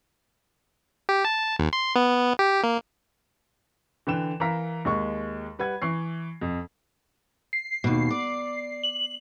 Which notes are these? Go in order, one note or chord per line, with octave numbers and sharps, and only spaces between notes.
G4
A5
D#2
C6
B3
G4
A#3
D3 E3 B4 G5 E7
E3 A#4 F5 A#5 B6
D#2 G#3 C#6
G3 B4 F#5 G#6
E3 C#6 C7
F2
C7
D#2 B2
D5
F#7